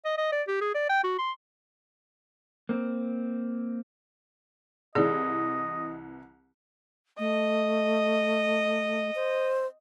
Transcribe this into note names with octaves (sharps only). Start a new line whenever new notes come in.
D#5
D#5
D5
G4
G#4
D5
G5
F#4
C6
A#3 C4
C2 E3 G#4 D5 D#5
A3 D#5
C5